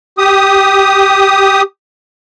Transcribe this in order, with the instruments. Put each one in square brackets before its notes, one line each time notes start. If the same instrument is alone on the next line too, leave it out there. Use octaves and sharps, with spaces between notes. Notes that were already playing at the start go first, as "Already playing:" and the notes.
[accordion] G4 D#6